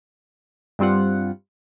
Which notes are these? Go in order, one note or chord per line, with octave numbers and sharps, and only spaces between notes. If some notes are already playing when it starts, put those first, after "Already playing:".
G2 G3 C4 F4 F#5